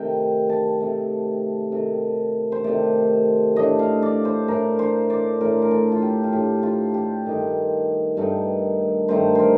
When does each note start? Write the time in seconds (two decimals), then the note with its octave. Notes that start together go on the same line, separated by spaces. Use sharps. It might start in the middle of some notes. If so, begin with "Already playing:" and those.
Already playing: C3 D#3 A3 G5
0.49 A5
0.80 C3 D#3 A3
1.72 C3 D#3 A3
2.52 C5
2.64 C3 D#3 A3 D5
3.56 A2 A3 D4 D#5
3.79 F5
4.02 D5
4.25 C5
4.48 A2 A3 D4 A#4
4.79 C5
5.10 D5
5.41 A2 A3 D4 A#4
5.62 A#4
5.71 A4
5.92 F4
6.02 G4
6.24 F4
6.33 A2 A3 D4 G4
6.63 F4
6.94 G4
7.25 G2 D#3 A3 D#4
8.17 G2 D#3 A3 D#4
9.08 G2 D#3 A3 D#4 C5
9.35 A#4 C5